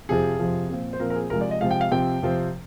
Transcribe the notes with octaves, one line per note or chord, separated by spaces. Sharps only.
F2 C3 F3 G#4
F2 C3 F3
A#2 F3 C4
C5
A#2 F3 C4 A#4
A#4
G#4
C3 F3 G#3 A#4
D5
D#5
C3 F3 G#3 F5
G5
F5
C3 F3 C4 G5
C3 F3 C4